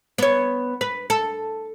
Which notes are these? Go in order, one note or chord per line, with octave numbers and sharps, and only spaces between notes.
B3 C#5
B4
A4